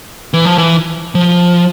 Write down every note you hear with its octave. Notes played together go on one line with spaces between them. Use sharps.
E3
F3
E3
F3